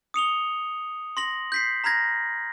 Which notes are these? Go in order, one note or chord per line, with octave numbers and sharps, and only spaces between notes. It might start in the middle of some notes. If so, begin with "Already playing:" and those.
D#6 C#7 F7 G7
C6 A#6 F#7
G6 B6 C7
A#5 B5 F6 G#6 A#6